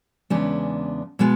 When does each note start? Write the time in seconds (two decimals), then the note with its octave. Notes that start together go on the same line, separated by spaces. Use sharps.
0.30 E2 C#3 G#3 B3 D4
1.19 B2 G#3 B3